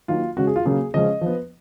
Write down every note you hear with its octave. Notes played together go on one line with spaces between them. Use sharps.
D#3 F#3 A#3 F4
C#3 G#3 C#4 F#4
G#4
F4
C#3 F#3 A#3 C#4 G#4
C#3 F3 G#3 C#4 D#5
F3 B3